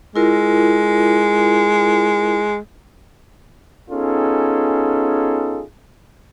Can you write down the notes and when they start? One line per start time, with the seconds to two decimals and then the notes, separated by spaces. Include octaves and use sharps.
0.16 G#3 E4 F4 A#4
3.90 B3 C#4 D#4 F4 G#4 A4